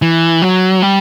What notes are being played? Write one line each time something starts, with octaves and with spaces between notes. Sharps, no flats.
E3
F#3
G3